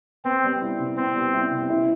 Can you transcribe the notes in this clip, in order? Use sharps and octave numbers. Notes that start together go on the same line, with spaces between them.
B3 C4
G3
E4
C3
B3 C4
G3
E4
C3
E4